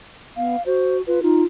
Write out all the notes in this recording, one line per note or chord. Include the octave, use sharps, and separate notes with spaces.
B3 F5
F#4 C5
F4 B4
D#4 F4